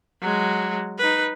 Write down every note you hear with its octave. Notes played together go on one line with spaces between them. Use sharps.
F#3 G#3
D#4 B4